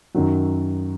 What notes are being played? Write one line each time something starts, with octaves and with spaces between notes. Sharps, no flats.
F#2 D#3 F#3